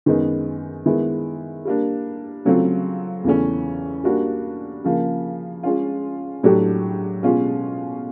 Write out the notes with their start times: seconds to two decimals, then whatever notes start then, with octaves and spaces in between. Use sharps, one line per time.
0.06 F#2 D#3 G#3 B3 D#4
0.86 D#3 G#3 B3 E4
1.65 G3 A#3 D4
2.45 C#3 F#3 A3 C4 F4
3.24 E2 C#3 E3 A3 C#4
4.04 G3 A#3 D4 F#4
4.84 C#3 F3 A#3
5.63 G#3 C#4 F4
6.43 A2 F#3 A3 D4 G4
7.23 B2 G#3 C#4 F4